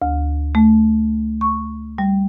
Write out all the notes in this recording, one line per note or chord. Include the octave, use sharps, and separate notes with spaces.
D2
A3
C#6
G3